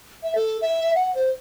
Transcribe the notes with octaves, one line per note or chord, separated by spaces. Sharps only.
E5
A4
E5
F#5
C5